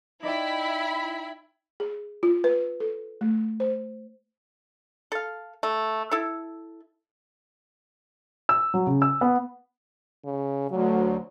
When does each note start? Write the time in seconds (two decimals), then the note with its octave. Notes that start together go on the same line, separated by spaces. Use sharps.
0.23 D#4 E4 D5 G5 B5
1.80 G#4
2.23 F4
2.44 B4
2.80 A4
3.21 A3
3.60 C5
5.12 A4 F5
5.63 A3
6.11 E4 A4
8.49 E6
8.74 F#3
8.87 C#3
9.02 E6
9.21 B3
10.25 C#3
10.71 D2 F#3